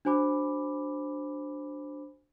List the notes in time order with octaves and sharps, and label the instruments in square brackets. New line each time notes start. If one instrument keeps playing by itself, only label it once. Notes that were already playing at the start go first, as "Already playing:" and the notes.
[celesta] D4 F#4 C5 G#5 B5 D6